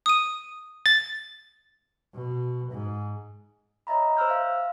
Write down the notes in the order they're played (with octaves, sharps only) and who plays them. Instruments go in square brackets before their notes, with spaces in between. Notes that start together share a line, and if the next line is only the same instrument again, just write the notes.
[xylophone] D#6 D#7
[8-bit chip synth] A6
[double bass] B2
G#2
[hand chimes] C#5 D#5 E5 A#5 B5
C5 E6 F6 G6
E5 F5